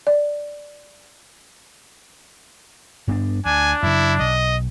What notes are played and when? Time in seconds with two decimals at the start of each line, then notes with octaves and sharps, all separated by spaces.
0.07 D5
3.08 G2 B3 D4
3.46 D2 D4 G#5
3.83 F#2 C#3 E4
4.20 B1 D#5